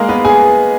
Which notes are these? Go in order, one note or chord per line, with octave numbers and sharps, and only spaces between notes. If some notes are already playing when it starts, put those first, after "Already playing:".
Already playing: G#3 A#3 G#4 A#4
B3 B4
G#4 G#5